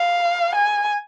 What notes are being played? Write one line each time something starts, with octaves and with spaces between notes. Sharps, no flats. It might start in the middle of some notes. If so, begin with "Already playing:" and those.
Already playing: F5
G#5